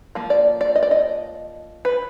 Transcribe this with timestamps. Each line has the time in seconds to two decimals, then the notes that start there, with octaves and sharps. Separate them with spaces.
0.15 F3 A#3
0.30 D5
0.61 D5
0.76 D#5
0.83 D5
0.91 D#5
1.85 B4